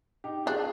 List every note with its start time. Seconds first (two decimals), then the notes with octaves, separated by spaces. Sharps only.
0.24 D#4 G4
0.46 D4 F4 G#4